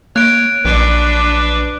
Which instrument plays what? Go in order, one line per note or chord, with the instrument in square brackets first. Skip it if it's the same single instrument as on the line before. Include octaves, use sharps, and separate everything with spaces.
[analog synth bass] A#3 [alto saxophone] C#5 [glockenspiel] F#6 D7
[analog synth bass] A#1 [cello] F#3 D4 [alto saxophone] B4